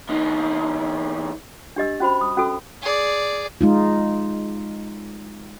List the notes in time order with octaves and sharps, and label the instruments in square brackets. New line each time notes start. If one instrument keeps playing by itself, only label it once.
[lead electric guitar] E2 D#4
[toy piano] D4 G4 D#5 E6
C#4 F#4 C5 B5
D#6
C#4 F#4 A4 E6
[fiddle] G#4 D5
[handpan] G#3 D#4 F4